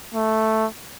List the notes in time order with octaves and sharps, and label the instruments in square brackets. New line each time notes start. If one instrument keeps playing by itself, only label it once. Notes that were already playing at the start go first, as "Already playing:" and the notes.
[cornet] A3